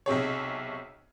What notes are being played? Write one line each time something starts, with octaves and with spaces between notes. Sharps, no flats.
B1 C3 G#4 C#5